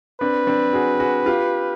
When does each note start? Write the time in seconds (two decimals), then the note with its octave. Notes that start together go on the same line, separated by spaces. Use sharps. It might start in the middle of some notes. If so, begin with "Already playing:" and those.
0.21 C4 D4 B4
0.47 C4 D4
0.73 F#4 G#4
1.00 F#4 G#4
1.26 F4 G4